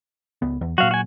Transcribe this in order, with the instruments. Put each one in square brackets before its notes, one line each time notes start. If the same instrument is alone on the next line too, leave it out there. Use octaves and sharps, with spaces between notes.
[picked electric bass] C#2 B3
E2
[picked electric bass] A#2 F#3 [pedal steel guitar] F#4 F5
[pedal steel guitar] F#4 G#5